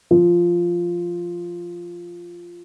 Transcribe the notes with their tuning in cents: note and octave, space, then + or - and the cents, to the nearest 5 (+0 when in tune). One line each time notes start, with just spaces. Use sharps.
F3 -5